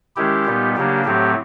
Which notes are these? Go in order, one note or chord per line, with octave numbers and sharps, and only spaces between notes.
D#3 G#3 C#4 E4 G4
A#2 G3 B3 D#4
C#3 F#3 A#3 D4 G4
A2 F#3 A3 C4 G4